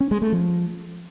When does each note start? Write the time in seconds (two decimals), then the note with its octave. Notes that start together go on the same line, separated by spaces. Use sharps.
0.01 C#4
0.11 G#3
0.22 A3
0.32 F3